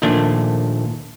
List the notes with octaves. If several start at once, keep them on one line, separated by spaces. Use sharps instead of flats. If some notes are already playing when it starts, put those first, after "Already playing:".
A#1 D#2 A#2 A3 D4